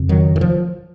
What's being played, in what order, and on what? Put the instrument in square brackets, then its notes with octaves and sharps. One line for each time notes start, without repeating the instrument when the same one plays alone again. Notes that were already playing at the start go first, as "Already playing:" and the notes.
Already playing: [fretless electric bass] F2 C#3
D#3 F#3
D#3
F3